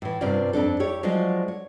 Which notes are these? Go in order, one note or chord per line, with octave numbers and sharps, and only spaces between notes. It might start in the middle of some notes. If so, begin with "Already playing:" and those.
A2 E3
G2 C3 C4 C#4 F4 D5
F2 C4 D4 A4
E4 G4 C#5
F3 F#3 G#3 F4 D5 D#5
C#5